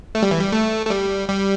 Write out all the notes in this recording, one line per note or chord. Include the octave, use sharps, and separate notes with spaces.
A3
G3
E3
G3
A3
A3
G3
G3